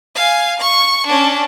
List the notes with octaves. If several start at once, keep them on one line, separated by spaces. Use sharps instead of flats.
F5 G#5
C#6
C#4 D4